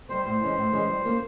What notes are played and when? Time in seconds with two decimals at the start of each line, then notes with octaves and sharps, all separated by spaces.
0.09 G3 C4 C5
0.25 A2 C5
0.41 E3 G#3 C#4
0.57 A2
0.73 E3 G#3 C#4
0.89 G3
1.05 A#3 C#4 F4